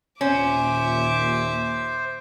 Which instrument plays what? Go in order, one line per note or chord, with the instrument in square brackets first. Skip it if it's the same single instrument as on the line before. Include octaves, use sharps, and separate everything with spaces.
[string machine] D#2 A#2 G#5 [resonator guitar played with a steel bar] C#4 [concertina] C5 [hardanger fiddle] E5 D6